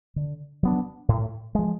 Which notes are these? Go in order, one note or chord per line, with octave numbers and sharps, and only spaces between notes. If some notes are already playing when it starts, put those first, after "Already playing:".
D3
F#3 B3 D4
A2
F3 G#3